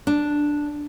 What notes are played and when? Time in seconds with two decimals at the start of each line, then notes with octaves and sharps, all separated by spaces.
0.07 D4